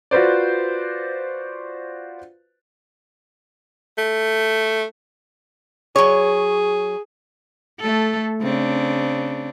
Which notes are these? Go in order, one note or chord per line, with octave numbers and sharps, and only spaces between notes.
F4 F#4 B4 C5 D5
A3
F#3 G#4 C#5
A3 A4
C#3 C4 D4